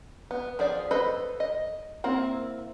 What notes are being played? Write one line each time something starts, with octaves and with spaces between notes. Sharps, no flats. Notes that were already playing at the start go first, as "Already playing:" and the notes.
B3
F3 G#4 C5 D5
A4 B4 C5 D#5 B5
D#5
A#3 C4 E4